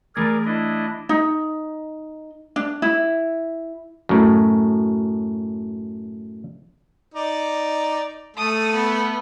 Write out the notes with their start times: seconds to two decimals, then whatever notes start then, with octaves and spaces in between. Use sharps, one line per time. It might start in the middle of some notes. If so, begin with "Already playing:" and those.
0.15 E3 A3 G#4 A#4 D5 G#6
0.45 D4 E4 D#5
1.09 D#4
2.56 D4
2.82 E4
4.09 F#2 A2
7.15 D#4 D5
8.37 A3 A4 D#6 D#7
8.73 B3